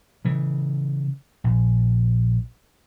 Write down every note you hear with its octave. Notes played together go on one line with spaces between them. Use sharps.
C#3 E3
A#1